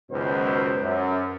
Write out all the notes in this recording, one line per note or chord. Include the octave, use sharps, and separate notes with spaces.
C#2 F#2 B2 D#3 B4 C5
F#2